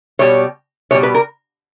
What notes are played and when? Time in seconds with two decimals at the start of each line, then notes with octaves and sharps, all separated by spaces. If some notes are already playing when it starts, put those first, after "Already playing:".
0.19 B2 G3 C#5
0.91 B2 G3 C#5
1.03 B4
1.14 A#4